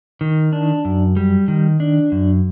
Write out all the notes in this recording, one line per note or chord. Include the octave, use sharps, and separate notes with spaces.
D#3
D4
F#2
G3
D#3
D4
F#2